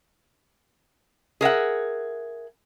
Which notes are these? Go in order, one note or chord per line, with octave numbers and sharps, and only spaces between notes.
G#4 A#4 E5 F#5